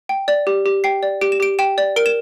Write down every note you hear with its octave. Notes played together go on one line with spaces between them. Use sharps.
G5
D5
G4
G4
G5 C7
D5
G4 D7
E7
G4 D7
G5 E7
D5
A#4 D7
E7